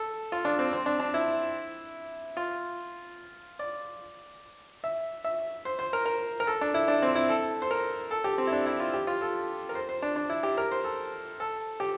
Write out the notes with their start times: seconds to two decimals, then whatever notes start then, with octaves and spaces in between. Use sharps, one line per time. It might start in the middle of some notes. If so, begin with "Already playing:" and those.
Already playing: A4
0.32 F4
0.45 D4
0.59 C4
0.73 C4
0.86 D4
1.00 D4
1.14 E4
2.37 F4
3.59 D5
4.84 E5
5.24 E5
5.65 C5
5.79 C5
5.93 A#4
6.06 A#4
6.40 A#4
6.47 A4
6.61 D4
6.74 E4
6.88 D4
7.02 C4
7.15 E4
7.29 A4
7.62 C5
7.71 A#4
8.11 A4
8.24 G4
8.38 C4
8.47 E4
8.52 D4
8.66 E4
8.80 F4
8.94 G4
9.07 F4
9.21 A4
9.69 A#4
9.75 C5
9.89 C5
10.02 D4
10.16 D4
10.29 E4
10.43 G4
10.57 A#4
10.72 C5
10.84 A4
11.40 A4
11.80 G4